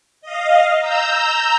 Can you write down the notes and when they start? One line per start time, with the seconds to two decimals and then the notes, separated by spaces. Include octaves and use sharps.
0.21 D#5 F5
0.79 A#5 E6 G6